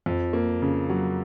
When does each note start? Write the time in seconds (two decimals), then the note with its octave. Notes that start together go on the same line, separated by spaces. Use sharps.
0.06 F2
0.33 A#3
0.62 C#3
0.89 F#3